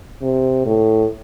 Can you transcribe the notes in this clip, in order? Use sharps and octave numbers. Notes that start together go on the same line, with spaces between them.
C3
A2